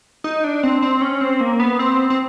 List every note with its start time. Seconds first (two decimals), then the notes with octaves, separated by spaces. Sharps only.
0.24 D#4
0.44 D4
0.63 C4
0.82 C4
1.01 C#4
1.21 C4
1.40 A#3
1.60 B3
1.79 C4
2.10 C4